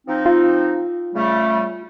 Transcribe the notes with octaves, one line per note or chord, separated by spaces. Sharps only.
F3 C4 D#4
F4
C#3 G3 A3